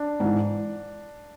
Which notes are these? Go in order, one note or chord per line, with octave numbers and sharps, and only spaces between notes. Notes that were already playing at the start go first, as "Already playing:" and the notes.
Already playing: D4
G#2 E3